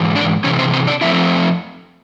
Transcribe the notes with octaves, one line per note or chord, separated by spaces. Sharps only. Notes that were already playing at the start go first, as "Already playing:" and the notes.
Already playing: G#2 E3
D4 D5
C3 E3 C#4 C#5
C4 C5
C4 C5
D4 D5
F3 A3 C4 E4 E5